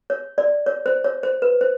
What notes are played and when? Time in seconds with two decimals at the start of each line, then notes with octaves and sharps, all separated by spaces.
0.10 C#5
0.38 D5
0.66 C#5
0.86 C5
1.04 C#5
1.23 C5
1.42 B4
1.61 C5